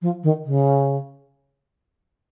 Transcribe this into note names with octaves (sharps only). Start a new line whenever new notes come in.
F3
D#3
C#3